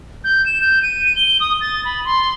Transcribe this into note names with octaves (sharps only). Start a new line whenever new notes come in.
G6
E7
G6
D#7
D#7
G7
D#6
A6
B5
C6